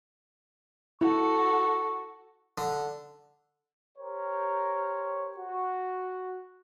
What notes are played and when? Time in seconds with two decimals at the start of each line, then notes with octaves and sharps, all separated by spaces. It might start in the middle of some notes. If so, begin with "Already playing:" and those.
1.01 E4 F#4 A4 C#6
2.58 D3
3.98 G4 A#4 C5 C#5
5.38 F#4